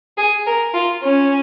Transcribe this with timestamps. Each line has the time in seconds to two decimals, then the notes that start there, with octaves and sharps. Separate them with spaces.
0.18 G#4
0.46 A#4
0.74 F4
1.03 C#4